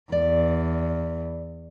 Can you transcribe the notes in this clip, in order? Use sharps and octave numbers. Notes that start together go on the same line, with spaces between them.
E2 D5